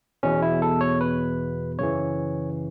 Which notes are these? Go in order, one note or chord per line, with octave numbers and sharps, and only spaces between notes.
E2 B2 C#4
E4
A4
C#5
B4
F#2 C#3 E3 C#5